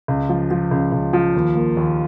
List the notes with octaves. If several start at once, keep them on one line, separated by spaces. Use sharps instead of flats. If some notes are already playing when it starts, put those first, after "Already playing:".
C#2
F3
F3
C#2
C#2
F3
D#2
A#3
D#2